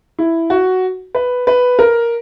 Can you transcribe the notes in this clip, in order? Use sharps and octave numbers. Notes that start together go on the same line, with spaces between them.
E4
F#4
B4
B4
A#4